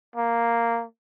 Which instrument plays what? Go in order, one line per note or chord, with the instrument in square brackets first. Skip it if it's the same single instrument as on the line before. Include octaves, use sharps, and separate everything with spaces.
[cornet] A#3